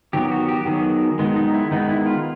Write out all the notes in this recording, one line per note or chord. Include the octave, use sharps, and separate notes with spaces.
D#3 F#3 B3 G4
F#4
G4
D#3 F#3 B3 G#4
D#3 G#3 B3 D#4
D#4
E4
D#3 G#3 B3 D#4
E4
F4